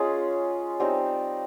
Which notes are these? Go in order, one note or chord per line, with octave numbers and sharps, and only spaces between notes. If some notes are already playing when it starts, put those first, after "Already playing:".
Already playing: G#3 C#4 F4 G#4
G3 C4 D#4 G4